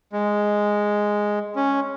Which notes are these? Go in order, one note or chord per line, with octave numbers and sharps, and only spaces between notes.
G#3
C#4